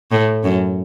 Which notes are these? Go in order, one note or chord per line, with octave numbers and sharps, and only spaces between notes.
A2
F#2